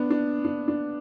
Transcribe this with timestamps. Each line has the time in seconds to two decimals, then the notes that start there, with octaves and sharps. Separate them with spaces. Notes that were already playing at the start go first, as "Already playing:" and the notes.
Already playing: B3 D4
0.10 D4
0.45 D4
0.68 D4